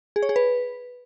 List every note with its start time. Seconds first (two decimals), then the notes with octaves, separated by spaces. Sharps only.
0.16 G#4
0.23 C#5
0.29 G#4
0.36 B4